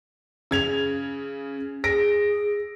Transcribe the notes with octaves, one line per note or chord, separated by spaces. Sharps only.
C#3 G#6 F7
G#4 A#6 D7